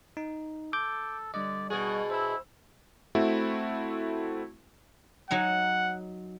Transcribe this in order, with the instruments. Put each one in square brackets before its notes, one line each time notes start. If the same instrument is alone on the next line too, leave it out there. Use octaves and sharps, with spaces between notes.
[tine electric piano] D#4
[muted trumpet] A4 [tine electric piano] D6 G6
[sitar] D3 [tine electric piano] G3 D#5 [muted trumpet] D5
[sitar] B2 G#4 [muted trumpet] F#4
[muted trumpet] E4 [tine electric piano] C5 E6
[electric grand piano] A3 C4 E4 F#4
[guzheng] F#3 D#4 G#5 [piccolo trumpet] F#5